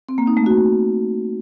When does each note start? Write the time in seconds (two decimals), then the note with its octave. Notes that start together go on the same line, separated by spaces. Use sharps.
0.09 C4
0.18 A#3
0.27 D#4
0.37 A3
0.46 F#4